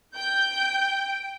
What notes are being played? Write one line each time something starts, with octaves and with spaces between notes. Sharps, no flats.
G5 G6